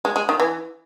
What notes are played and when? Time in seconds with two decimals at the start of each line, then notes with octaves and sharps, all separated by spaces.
0.05 G#3
0.16 G#3
0.29 D#3
0.40 E3